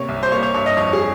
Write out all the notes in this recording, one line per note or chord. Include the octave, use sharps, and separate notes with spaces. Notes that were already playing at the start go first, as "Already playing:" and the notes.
Already playing: C3 A#3 C#5
C2
C5
A#3 C#5
C#5
G2 C#5
D#5
F2 C#5
G#4